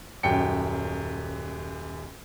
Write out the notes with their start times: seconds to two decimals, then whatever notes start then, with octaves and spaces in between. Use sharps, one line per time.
0.23 D#1 F#2 G5 C#7